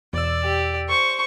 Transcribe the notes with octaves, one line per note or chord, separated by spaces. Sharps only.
E2 B2 D5 E6
G4
C5 C#6